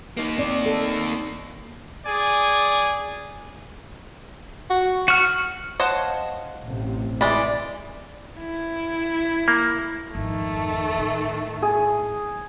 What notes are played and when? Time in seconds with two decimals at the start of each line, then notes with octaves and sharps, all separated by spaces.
0.17 A#3 D#4
0.38 C4 D5
0.66 A4
2.05 G#4 D5 G#5
4.70 F#4
5.08 F#4 C#6 F6
5.80 C5 C#5 D#5 F5 F#5 A5
6.64 A1 C3
7.21 E3 G#3 D5 B5
8.40 E4
9.48 A#3
10.15 G#1 F2 D#3 A3
10.98 A2
11.62 G#4